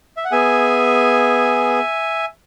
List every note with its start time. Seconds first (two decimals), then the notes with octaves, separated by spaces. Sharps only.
0.17 E5
0.25 F#5
0.32 B3 G#4 E5 G#5